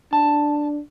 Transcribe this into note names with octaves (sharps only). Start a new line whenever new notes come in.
D4 A5